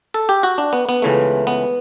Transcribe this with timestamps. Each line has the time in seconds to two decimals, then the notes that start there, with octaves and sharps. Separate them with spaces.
0.14 A4
0.29 G4
0.43 F#4
0.58 D4
0.73 B3
0.89 B3
1.02 C#2 C#3 E3 A3
1.47 B3